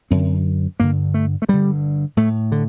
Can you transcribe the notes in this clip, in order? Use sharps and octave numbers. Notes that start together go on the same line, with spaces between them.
F#2 D3 C4
G2 D3 A#3
A3
A3
G2 D3 G3
A2 A3
D3